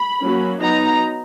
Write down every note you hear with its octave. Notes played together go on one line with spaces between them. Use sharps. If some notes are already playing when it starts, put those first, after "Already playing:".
Already playing: B5
F#3 A#3 C#4
F#3 B3 D#4 A#5